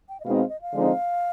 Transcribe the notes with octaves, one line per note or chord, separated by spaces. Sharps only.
G5
D#5
B2 G#3 C4 D#4 F5
F5
D#5
F5
D3 F3 G#3 C4 D#4